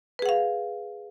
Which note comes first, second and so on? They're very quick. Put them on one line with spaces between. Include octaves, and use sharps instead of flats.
B4 G#4 F#5 F5